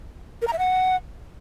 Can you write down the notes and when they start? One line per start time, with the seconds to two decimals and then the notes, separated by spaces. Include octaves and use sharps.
0.42 A#4
0.47 A#5
0.53 E5
0.59 F#5